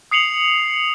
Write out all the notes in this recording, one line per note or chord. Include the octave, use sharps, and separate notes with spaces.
D#6 C7 C#7 F7 F#7